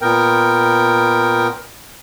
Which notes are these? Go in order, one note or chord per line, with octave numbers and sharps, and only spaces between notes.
A#2 B3 A#4 G5